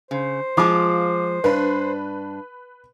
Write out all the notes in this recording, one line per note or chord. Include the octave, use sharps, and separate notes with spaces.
C#3 C5
F3 G#3 F4 D6
G2 D4 B4 B5